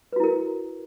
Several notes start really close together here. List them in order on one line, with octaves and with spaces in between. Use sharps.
B4 F#4 E4 A#4